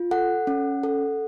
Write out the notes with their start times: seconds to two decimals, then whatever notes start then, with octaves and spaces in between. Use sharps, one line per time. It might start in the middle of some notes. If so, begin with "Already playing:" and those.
Already playing: F4
0.11 A4 F#5
0.47 C#4
0.83 A4